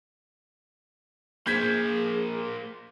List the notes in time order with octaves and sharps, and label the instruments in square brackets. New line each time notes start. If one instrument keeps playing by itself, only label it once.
[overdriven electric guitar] A#3 C5 [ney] G#4 [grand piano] G6 G#6 B6